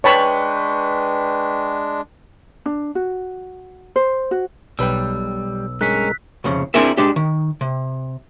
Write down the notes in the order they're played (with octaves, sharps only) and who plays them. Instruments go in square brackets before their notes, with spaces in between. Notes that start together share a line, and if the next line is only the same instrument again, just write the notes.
[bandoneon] G#3 D4 [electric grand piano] B4 G5 C#6 [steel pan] C#5 A5 B5
[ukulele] D4
F#4
C5
F#4
[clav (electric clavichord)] B1 B4 G5 [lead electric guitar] G3 [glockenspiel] E6
[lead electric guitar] G2 C#4 [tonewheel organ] G#3 A#4 [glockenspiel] F#6 B6
[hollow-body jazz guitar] C2 F2 C#3
C4 D4 E4 G#4 A#4 E5
G#3 D4 G4
D#3
C3